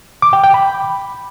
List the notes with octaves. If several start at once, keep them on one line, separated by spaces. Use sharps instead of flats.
D6
G5
G5
B5